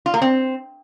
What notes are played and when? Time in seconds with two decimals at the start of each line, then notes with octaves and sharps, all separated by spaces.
0.06 F4
0.14 A#3
0.22 C4